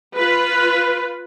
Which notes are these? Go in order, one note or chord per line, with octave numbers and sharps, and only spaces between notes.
F4 B4